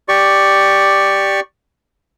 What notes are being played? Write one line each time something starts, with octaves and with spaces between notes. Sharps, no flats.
G4 D5 C#6